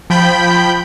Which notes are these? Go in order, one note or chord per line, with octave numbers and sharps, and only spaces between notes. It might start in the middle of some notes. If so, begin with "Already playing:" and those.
F3 G5 B5 G6